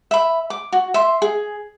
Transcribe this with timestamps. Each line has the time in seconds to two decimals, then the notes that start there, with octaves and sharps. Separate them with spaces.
0.11 E5 B5
0.50 D6
0.72 F#4
0.94 E5 C6
1.22 G#4